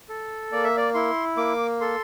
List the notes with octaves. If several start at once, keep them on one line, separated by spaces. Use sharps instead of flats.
A4
A#3 D5
E5
D5
E4 C6
A#3 D6
A4 C6